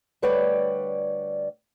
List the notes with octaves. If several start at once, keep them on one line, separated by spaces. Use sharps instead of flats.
D2 G3 B4 C#5 D5 G5